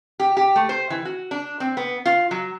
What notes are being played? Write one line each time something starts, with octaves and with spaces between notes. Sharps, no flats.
G4
G4
A3
C5
E3
F#4
D4
C4
B3
F4
F#3